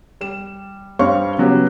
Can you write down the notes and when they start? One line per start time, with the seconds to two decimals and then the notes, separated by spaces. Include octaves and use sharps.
0.21 G3 E7
0.99 G2 G3 C4 C#5 F5 C#6
1.38 C#3 F#3 B3 C#4 G4